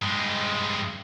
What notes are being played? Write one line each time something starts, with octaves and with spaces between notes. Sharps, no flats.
G2 G#3